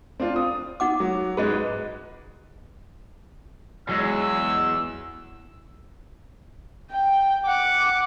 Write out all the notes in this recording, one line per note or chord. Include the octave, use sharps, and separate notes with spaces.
C4 D4 F4
D#6
D#4 F#5 D6
F#3
G#2 G#3 G#4 B4 D#5
E2 F#3 G#3 E6
G5
F#5 D6